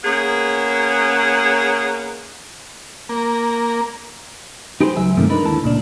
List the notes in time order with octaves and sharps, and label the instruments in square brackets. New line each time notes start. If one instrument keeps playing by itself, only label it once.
[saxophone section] A#3 B3 C#4 G#4
[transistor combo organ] A#3
[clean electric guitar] D#4 G4 G#4 B4 C5
C#2 F#3 E5 G#5
G2 C3 D#3 F3 A3 A#3
G#3 D4 D#4 A#4 B4
D#2 D3 E4 A5
C#2 A#2 D4